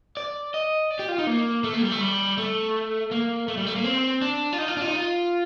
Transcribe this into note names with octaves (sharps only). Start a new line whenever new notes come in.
D5
D#5
D5
G4
F4
D#4
A#3
A3
A#3
G3
A3
G3
A3
A#3
A3
G3
A3
A#3
C4
D4
F4
D#4
F4
D4
F4
D#4
F4